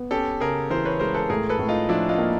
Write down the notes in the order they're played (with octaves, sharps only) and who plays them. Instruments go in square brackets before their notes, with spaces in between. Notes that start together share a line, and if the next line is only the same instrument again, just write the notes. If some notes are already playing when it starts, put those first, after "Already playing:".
Already playing: [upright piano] B3
[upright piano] C#4 [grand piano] G4 A4
[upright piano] C#3 [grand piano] G#4 A#4
[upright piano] E3 [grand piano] A#4 C5
[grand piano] B4 C#5
[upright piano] G#3 [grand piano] A#4 C5
[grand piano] A4 B4
[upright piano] A2 [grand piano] G#4 A#4
[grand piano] A4 B4
[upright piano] A2
[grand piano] D#4 F4
[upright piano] F3 [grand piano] D4 E4
[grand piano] D#4 F4
[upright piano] A#3